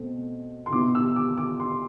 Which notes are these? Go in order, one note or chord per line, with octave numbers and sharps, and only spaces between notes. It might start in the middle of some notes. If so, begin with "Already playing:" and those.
Already playing: B2 A3 C4
C6
B2 B3 E4 D6
E6
D6
D6
C6